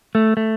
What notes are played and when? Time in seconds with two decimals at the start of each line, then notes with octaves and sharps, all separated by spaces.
0.15 A3
0.37 A3